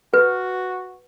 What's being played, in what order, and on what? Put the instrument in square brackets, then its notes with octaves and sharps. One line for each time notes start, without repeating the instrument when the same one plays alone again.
[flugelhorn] F#4 [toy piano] B4